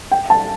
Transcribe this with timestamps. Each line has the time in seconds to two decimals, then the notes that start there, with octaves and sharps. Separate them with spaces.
0.12 G5
0.30 A5